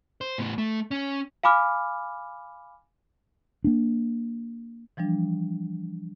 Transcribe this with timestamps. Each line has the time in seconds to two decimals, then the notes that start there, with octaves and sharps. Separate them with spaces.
0.21 C5
0.38 A2 B3
0.58 A3
0.91 C#4
1.43 F5 G#5 B5 D6 F6
3.64 A#3 D4
4.97 E3 F3 G3 D4